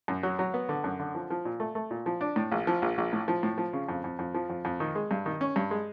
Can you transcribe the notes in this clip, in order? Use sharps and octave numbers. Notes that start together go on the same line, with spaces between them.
F#2
F#3
F#3
B3
D3
F#2
D3
F3
F3
A#2
A3
A3
A#2
F3
D4
A2
A#1
F3
A#1
A#1
A2
F3
A2
F3
C#3
F2
F2
F2
F3
F2
F2
D#3
G#3
G2
D#3
C#4
G2
G#3